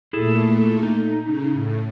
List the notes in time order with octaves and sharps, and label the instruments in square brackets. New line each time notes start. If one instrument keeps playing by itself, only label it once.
[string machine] A#2 A3 [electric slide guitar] E4 G#4 A4
[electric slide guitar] D#4
[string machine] C#3
A2